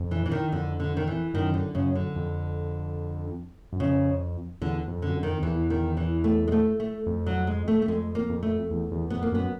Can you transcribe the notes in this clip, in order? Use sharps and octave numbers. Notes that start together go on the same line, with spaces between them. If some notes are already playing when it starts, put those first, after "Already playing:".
Already playing: F2
E3
E3
D#3
F2 D3
D3
D#3
E3
F#2 D#3
D3
F#2 C#3
D3
F2
F#2
F2 C#3
E2 D3
F2
D3
F#2
F2
D#3
E2 E3
D#3
E3
A3
G#3
A3
A3
F2
F#3
G#3
A3
A3
F2 G#3
A#3
F2
A3
E2
E2
F2 B3
A#3
F#2 B3